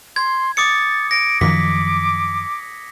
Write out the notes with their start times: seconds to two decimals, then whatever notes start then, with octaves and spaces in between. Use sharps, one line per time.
0.16 C6 G#6
0.57 D6 D#6 A6 C#7
1.11 A#6 D7
1.41 F#2 D#3 F3 D6 B6